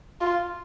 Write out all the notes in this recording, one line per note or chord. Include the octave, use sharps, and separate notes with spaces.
F4